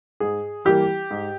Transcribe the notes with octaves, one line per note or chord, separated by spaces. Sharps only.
G#2 G#4
E3 G3 A#3 G4
G#2